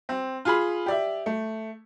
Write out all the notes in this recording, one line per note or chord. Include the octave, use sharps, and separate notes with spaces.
C4
F4 G#4 B5
G4 D5 E5
A3